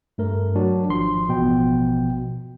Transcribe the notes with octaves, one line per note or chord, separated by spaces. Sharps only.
G2 A3 A#4
F#3 D4 F#4
G#1 F3 C6
A1 B2 F3 G5